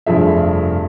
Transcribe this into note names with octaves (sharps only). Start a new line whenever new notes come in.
F1 G2 F3 G#4 E5